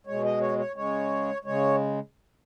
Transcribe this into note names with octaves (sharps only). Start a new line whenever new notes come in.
B2 G#3 C#5
D#5
C#5
C#5
C#3 G#3 C#5
C#3 G#3 C#5